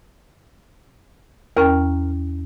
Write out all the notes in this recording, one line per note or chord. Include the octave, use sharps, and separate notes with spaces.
E2 C#4 A#4 G5